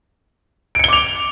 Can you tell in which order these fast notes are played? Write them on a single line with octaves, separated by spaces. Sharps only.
D7 C#7 G7 D6 F7